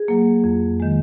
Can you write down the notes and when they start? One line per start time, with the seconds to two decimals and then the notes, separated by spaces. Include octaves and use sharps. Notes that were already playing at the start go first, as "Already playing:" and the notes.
Already playing: G#4
0.08 F#3 A#3
0.44 F2
0.80 D#3 G#3